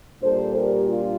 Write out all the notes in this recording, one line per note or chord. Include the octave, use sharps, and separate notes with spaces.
A#2 G3 D4 A4 C5
G4 A#4
F4